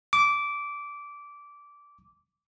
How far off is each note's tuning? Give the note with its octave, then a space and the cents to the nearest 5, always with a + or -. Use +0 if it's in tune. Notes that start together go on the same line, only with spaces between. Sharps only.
D6 -15